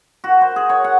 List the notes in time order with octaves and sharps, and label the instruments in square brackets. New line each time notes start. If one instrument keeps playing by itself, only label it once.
[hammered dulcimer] F#4
C5
G#4
C#5
F#5